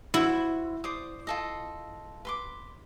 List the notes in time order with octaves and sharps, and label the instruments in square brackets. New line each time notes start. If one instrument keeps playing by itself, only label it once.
[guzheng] E4 [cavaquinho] F#4 C5
[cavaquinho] C5 D5 D#6
F4 A4 D#5
B4 C6 D6